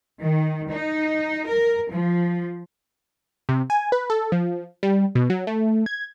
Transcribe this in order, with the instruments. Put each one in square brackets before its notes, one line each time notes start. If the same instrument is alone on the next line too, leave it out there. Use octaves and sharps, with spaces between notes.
[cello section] D#3
D#4
A#4
F3
[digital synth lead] C3
G#5
B4
A4
F3
G3
B2
F#3
A3
G#6